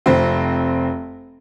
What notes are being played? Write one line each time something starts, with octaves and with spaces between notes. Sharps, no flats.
F1 C4